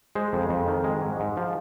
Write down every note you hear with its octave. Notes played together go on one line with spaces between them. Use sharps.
G#3 C5
F2
F2
D#3
G#3
G#2
G#2
F3